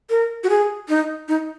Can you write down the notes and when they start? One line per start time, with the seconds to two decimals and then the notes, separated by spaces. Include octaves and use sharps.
0.10 A#4
0.44 F#4
0.50 G#4
0.89 D#4
1.28 D#4